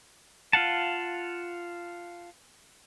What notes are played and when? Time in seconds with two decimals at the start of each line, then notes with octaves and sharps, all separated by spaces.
0.53 F4 F5 F#5 A5